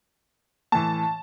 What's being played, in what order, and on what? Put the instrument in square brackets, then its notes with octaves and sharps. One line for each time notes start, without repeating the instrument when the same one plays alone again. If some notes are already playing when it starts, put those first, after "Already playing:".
[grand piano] A2 E3 A5